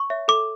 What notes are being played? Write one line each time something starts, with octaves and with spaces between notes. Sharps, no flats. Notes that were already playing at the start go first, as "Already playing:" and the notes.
Already playing: C#6
C#5 E5
A4 D6